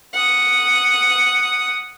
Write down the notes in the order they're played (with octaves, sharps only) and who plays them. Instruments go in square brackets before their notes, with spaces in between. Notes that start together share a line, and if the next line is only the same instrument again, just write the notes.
[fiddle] F#5 D#6